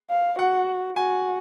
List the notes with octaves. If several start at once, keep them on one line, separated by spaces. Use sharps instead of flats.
F5
F#4 F#5
F#4 G#5